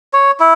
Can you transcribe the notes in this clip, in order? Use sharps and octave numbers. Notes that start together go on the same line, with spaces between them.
C#5
E4